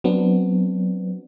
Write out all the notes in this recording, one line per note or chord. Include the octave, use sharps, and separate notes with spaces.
F#3 B3 C4 D4